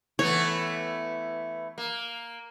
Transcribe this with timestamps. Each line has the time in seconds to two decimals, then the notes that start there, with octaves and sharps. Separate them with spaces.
0.19 E3 A3 B3 C#5
1.78 A#3